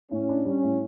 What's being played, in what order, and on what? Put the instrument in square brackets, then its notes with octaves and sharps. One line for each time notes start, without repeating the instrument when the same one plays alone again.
[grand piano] A2 [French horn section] C#4
[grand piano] D4
[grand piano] G3 [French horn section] C#4
[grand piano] A2